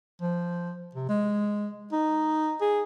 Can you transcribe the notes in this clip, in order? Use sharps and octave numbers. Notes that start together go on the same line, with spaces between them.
F3
C3
G#3
D#4
G#4